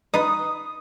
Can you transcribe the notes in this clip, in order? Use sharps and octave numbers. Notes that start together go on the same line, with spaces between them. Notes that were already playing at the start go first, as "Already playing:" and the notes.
D#4 F4 B4 D#6